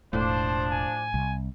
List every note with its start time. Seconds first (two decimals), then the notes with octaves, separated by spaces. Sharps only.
0.13 E1 A2 F3 D4 C5
0.72 G#5
1.14 C2